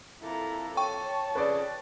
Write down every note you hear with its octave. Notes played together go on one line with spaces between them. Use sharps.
F2 A#3 E4 A4 A#5
C#5 G5 A5 C#6
F2 C#3 B4 D5